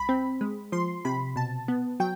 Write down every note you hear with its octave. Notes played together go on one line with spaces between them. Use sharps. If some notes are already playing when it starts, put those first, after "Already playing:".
Already playing: C2 B5
C4
G#3
F3 C6
C3 B5
B2 A5
B3
F#3 G5